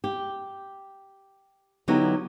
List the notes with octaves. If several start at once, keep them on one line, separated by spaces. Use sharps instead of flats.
G4
D3 F#3 B3 D#4 E4 G4